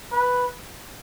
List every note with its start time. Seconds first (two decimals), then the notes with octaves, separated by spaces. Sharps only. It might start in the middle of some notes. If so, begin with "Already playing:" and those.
0.12 B4